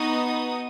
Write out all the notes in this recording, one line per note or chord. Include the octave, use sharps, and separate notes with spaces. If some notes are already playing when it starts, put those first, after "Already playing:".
Already playing: B3 D#4 F#4 D#6